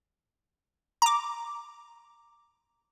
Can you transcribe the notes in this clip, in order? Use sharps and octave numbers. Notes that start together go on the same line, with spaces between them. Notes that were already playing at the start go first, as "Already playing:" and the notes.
A#5 D6